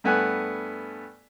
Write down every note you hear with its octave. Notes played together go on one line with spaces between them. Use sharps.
G2 A3 B3 G#5 F#6